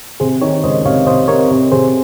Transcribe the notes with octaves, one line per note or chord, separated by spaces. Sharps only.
C3 G#4 C5
D#3 A#4 C#5
C#2 C5 D#5
C3 C#5 F5
C3 C5 D#5
C3 A#4 C#5
C3
C3 G#4 C5